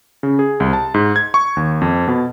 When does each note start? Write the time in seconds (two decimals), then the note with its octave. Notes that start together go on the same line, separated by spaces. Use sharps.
0.23 C#3
0.39 G#4
0.60 C2
0.73 A5
0.94 G#2
1.16 G#6
1.34 C#6
1.57 D#2
1.81 F2
2.08 B2